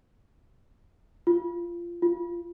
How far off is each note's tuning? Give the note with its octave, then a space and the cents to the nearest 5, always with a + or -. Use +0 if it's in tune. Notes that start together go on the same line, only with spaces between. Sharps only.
F4 -20
F4 -20